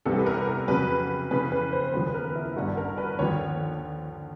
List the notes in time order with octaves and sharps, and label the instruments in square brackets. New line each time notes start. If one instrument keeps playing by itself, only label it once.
[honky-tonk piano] C2 C3 E3 G3 A4
B4
A#4
A#4
F2 C#3 F#3 B4
F2 C#3 E3 B4
B4
C5
D#2 C#3 F3 B4
B4
A#4
E4
A1 G2 D#3 F#4
A#4
B4
D#2 D3 F3 C#5